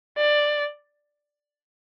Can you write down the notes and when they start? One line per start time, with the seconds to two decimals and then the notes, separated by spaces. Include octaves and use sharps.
0.17 D5